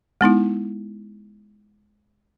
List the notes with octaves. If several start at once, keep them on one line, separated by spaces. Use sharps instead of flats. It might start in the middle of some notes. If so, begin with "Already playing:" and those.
G#3 B3 D#4 E4